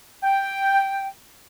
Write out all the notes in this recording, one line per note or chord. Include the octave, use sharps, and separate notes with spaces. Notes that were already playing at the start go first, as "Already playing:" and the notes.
G5